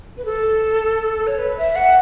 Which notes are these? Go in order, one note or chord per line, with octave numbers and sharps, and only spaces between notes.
B4
A4
C#5
B4
E5
F#5